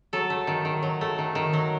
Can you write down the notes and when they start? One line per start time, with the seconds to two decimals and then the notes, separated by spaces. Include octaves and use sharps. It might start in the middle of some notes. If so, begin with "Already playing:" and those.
0.13 F#3 A4
0.30 A3
0.47 D#3
0.65 D#3
0.83 F#3
1.01 A3
1.18 D#3
1.35 D#3
1.53 F#3